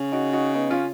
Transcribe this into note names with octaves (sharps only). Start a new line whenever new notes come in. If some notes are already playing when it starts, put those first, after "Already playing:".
Already playing: C#3
D#4 F#4
D#4 F#4
B3 D#4
C#4 F4